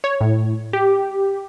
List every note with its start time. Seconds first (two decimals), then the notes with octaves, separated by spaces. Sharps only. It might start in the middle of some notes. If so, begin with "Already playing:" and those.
0.04 C#5
0.21 A2
0.73 G4